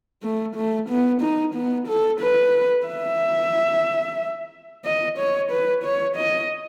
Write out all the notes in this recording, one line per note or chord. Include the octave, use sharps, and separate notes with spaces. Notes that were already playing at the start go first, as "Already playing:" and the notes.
A3
A3
B3
D#4
B3
A4
B4
E5
D#5
C#5
B4
C#5
D#5